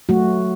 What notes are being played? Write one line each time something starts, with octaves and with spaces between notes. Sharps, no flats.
F#3 A3 F#4